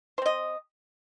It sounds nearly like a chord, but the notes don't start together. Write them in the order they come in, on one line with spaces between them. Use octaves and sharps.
C5 C4 D#5